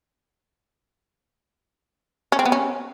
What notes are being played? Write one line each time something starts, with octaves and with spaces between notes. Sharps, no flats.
C#4
C4
B3
C#4